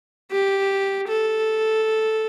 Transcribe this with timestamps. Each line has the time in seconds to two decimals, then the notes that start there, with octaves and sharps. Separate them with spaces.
0.32 G4
1.08 A4